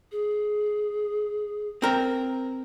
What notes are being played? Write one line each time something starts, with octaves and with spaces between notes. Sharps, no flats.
G#4
C4 A#4